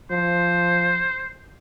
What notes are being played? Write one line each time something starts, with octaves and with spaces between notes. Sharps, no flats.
F3 C5